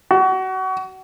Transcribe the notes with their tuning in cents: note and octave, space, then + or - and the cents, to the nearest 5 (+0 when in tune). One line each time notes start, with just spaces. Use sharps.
F#4 +30